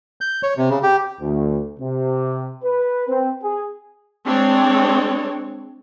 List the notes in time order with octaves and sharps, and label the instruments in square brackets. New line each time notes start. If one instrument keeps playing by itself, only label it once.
[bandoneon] G6
C#5
C3
C#3
G4
[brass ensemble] D2
C3
B4
C4
G#4
[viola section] G#3 C4 D4 C#5